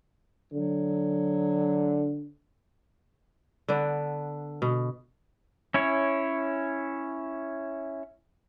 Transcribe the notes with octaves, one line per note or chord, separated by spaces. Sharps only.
D3 F#3
D3 B3 D4
B2
C#4 E4 C#5